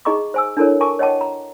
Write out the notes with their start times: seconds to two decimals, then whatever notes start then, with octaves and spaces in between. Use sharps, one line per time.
0.05 D#4 G#4 D#5 A#5 C#6 D6
0.34 C5 G#5 E6
0.57 D4 E4 A4 A#4 C#5
0.80 A#4 G#5 A5 C#6 D6
0.99 C#5 D#5 F#5 G5 A5 D6
1.21 A#5